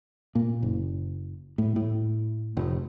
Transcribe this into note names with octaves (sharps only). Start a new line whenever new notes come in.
A#2
F#1
A2
A2
F1